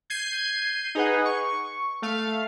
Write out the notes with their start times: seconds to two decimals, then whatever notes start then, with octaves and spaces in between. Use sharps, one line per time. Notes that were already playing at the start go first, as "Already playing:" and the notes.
0.10 G6 G#6 C7 D#7
0.95 D#4 G#4 B4 F#5
1.25 C#6
2.02 A3 F5